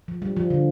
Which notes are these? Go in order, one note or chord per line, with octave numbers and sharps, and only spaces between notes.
F3
G3
F3
D3